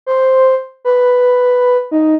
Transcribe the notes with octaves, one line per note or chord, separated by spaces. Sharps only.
C5
B4
D#4